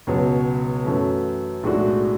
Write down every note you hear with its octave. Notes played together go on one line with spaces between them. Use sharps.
C#2 B2 F#3
F#2 E3 A3 C#4 F#4
B1 A2 G#3 D4 F#4